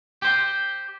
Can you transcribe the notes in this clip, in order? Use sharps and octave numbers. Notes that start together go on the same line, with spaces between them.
G4 C5